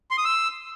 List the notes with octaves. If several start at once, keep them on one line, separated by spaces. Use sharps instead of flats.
C6
D#6
E6